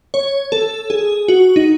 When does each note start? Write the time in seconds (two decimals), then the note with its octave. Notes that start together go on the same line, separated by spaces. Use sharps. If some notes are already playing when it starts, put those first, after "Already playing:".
0.14 C#5
0.52 A4
0.90 G#4
1.28 F#4
1.56 D#4